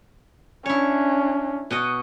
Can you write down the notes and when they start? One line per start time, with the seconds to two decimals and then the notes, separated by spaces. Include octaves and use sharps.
0.66 C#4 D4 E4 C#5
1.71 B2 F#4 D#5